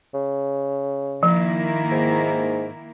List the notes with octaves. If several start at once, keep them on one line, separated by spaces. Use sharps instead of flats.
C#3
D#3 F3 A#3 E4
G#2